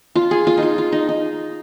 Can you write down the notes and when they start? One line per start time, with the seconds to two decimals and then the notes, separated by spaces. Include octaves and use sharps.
0.15 F4
0.31 G#4
0.47 F4
0.57 D#4
0.63 F4
0.78 F4
0.92 D#4
1.09 D#4